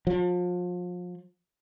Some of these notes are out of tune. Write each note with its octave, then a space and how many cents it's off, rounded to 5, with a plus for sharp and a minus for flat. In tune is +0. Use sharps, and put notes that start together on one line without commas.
F3 +35